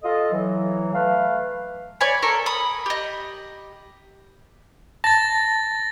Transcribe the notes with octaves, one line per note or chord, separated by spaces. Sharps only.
F4 A4 D#5
E3 F#3
A3 B4 F5
C#5 D5 G#5 B5
A4 A#4 C#6
B5 D#6
G4 D#5
A5 A6 A#6